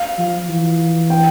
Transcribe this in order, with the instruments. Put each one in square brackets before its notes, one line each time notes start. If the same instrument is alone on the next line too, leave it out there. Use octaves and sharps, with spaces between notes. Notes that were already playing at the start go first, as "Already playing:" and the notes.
Already playing: [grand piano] F5
[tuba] F3
E3
[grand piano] G5